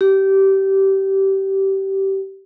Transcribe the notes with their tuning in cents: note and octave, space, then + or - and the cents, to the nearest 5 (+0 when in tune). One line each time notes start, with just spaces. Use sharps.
G4 -20